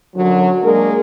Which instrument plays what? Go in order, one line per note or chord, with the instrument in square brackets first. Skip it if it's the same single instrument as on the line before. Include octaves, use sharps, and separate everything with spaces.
[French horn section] F#2 D3 F#3
G#3 A#3 D4 A#4